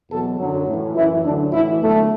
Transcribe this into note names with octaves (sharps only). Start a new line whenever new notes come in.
E2 B2 F#3 A4
F#2 D3 F#3
A2 E3
F#2 E3 E4
D2 D3 F#3 D4
A2 E3 E4
E2 D3 F#3 A3